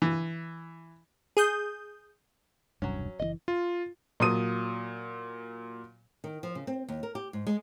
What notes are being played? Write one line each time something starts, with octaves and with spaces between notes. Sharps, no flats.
E3
G#4 D#6 G6
E1 C2 G2 F#3 C#4
F#1 C3 E3 D#5
F4
A#2 F#3 D#6 D#7
D#3
F3
C#3
C4
D#2
A#4
G4
G#2
G#3